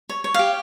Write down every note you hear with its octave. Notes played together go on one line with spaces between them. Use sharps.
C#5
C#5
G4 F5